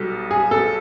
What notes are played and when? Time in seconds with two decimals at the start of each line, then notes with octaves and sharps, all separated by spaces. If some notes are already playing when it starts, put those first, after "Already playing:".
Already playing: B1 B2 G3 A4
0.31 G#4
0.51 A4